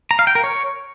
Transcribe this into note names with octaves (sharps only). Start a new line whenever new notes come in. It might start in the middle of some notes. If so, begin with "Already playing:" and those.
A#5
F5
G5
A#4
C#5